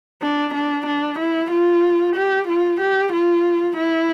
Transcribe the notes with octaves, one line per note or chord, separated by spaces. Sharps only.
D4
D4
D4
E4
F4
G4
F4
G4
F4
E4